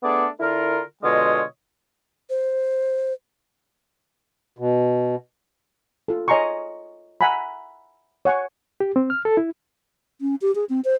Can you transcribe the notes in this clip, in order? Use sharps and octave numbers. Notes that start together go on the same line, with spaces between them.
A3 B3 D4 G#4 A4 D5
D3 E4 F4 A#4
B2 D3 G#3 F4 C#5 D#5
C5
B2
F4 A4
C#5 D#5 G#5 A#5 C6 C#6
E5 F#5 G#5 A#5 B5
C#5 F#5 G#5 C#6
G4
C4
F6
A4
E4
C#4
G4
G#4
C4
C5